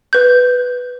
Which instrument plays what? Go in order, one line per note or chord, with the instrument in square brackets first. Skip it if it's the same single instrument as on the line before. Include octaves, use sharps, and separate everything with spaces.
[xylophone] B4 G6